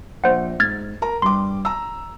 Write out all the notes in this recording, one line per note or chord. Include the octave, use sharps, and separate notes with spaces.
A#1 C5 F#5
G#2 F6 G#6 A6
A#4 A#5
G2 G3 C6 D6
A#5 E6